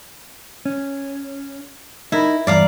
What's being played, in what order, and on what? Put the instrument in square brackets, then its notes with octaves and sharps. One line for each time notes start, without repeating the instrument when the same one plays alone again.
[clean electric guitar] C#4
[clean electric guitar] D#4 A#4 [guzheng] E4
[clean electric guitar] E2 G2 [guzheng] D5 F5 A#5